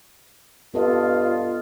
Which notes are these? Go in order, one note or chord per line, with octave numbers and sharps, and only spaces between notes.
G2 B3 F4 A4 D#5